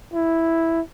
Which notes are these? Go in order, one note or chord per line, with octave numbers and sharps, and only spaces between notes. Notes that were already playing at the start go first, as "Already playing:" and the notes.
E4